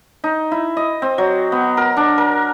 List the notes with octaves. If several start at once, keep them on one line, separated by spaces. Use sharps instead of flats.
D#4
E4
D#5
C4
F#3
B3
A#4
D4
A#4